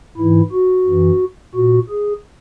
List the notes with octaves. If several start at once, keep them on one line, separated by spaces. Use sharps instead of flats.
G#2 E3 E4
F#4
F#2 E3
A#2 F#4
G#4